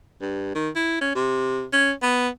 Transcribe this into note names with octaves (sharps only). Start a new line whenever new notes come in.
G2
D#3
E4
C#4
C3
C#4
B3